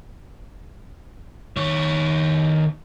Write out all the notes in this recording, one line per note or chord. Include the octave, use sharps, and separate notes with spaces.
D#3 C#5